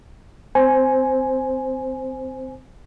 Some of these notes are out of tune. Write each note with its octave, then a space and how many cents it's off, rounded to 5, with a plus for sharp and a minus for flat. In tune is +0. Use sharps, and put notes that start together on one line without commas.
C4 -15 C5 +0 G#5 +5